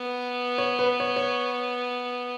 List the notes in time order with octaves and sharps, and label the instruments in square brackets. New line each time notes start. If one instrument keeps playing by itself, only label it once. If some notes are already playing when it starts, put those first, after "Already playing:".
Already playing: [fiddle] B3
[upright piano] C#5
B4
C#5
C#5